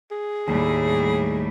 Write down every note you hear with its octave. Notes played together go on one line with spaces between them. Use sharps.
G#4
D#2 A2 G3 A3